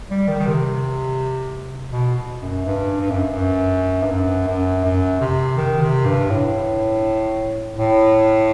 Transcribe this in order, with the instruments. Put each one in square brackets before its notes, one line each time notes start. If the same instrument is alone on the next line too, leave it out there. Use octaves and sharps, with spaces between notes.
[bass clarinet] G3
D#3
D#3
C3
B2
F#2
G2
G2
F#2
F#2
G2
F#2
F#2
F#2
C3
D#3
C3
G2
A2
A2